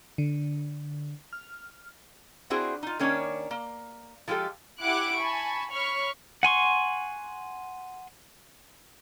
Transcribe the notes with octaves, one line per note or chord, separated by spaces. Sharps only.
D3
F6
C4 D4 E4 F#4 G#4 C5
D#4 F4
D#3 A#3 C#4 D4 C#5 A#5
A#3
F3 G#3 F4 G4 A4
E4 G4 F#5 D6 F#6 D7
G#5 A5 B5 C#6
C#5 B5 C#6 F6
F#5 G#5 C6 C#6